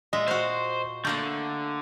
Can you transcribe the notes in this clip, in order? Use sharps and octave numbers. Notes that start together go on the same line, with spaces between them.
A#2 G#3 D#5 E5
F#4 C5 F5
D3 A3 A#3 A4 G6